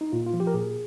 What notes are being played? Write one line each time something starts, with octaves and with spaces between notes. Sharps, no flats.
D#4
A#2 F4
F4
F3
G4
A#4
A#2 G#4